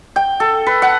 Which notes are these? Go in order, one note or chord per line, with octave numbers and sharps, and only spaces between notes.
G5
A4
B4
F#5